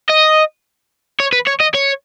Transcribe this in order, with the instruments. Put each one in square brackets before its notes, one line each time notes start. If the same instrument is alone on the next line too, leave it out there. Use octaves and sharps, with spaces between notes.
[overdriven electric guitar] D#5
C#5
B4
C#5
D#5
C#5